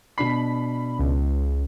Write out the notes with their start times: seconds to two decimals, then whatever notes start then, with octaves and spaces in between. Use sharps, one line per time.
0.18 B2 D4 B5 C7
0.99 C#2